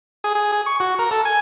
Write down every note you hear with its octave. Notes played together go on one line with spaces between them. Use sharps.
G#4
G#4
G#4
C#6
F#4
A#4
A4
G#5